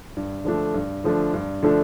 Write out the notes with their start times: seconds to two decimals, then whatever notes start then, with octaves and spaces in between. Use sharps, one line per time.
0.17 G2
0.45 D3 F3 A3 D4
0.74 G2
1.04 D3 F3 A3 D4
1.34 G2
1.63 D3 F3 A3 D4